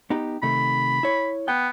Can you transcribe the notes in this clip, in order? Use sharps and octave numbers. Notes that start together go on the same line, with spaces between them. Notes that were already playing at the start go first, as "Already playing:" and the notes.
B3 D#4 G4
C3 D#3 A3 B5
E4 C#5
B3 G5